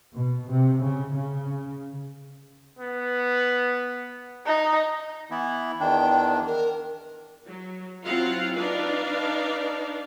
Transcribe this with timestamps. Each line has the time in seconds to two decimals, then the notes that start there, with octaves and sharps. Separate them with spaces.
0.15 B2
0.51 C3
0.84 C#3
1.14 C#3
2.79 B3
4.46 D#4
5.30 E3 B3 E4
5.80 E2 D#3 D4 G5
6.47 A#4
7.46 F#3
8.05 F#3 C4 E4 F4 F5 F#5
8.57 D4 D#4 B4 D5 F5